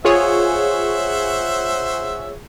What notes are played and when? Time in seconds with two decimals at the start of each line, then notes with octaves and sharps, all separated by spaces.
0.05 F4 G#4 C5 C#5 E5 F#5